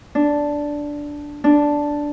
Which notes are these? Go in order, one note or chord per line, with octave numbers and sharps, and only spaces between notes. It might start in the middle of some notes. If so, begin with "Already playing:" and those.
D4
D4